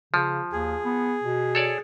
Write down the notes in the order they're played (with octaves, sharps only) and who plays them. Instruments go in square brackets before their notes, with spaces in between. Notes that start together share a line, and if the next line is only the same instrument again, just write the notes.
[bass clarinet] C#3 [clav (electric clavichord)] F3
[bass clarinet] D#2 [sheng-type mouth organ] G#4
[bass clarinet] B3
B2
[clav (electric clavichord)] A4 C#5 D5